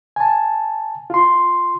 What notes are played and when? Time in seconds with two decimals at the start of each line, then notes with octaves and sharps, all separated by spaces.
0.16 G#5 A5
1.10 F4 C6